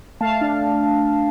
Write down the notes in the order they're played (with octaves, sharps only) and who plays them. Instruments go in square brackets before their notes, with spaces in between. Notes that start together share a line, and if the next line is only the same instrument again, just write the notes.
[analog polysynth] A3 F5 A5
D4